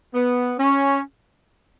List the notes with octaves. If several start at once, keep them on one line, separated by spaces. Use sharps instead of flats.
B3
C#4